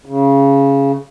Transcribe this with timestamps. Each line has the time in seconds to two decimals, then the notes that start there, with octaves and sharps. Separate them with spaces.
0.06 C#3